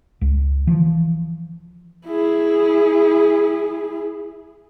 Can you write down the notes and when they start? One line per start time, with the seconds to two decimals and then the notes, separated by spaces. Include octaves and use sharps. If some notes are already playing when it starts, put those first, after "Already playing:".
0.21 C#2
0.67 E3 F3
2.07 E4 G#4